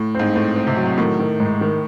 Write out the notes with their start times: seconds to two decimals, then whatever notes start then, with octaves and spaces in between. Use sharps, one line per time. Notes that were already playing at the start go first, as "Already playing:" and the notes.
Already playing: A2
0.15 G#2 C4
0.35 A2 C4
0.56 C4
0.67 C3
0.76 F#3
0.98 A2 D#3
1.19 D#3
1.40 G#2
1.61 D#3